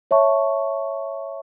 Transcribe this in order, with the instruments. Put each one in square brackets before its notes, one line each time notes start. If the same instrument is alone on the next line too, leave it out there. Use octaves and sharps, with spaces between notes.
[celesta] C#5 E5 A5 C#6